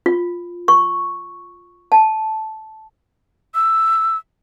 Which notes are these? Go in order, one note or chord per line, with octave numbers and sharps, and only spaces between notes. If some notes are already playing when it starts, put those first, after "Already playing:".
F4
C#6
A5
E6